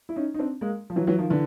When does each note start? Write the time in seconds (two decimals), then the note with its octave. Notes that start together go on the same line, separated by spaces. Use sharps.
0.09 E4
0.16 C#4 D#4
0.34 D#4
0.39 C4 D4
0.61 G#3 A#3
0.90 F3
0.96 E3 F#3
1.07 E3 F#3
1.18 D#3 F3
1.30 D3 E3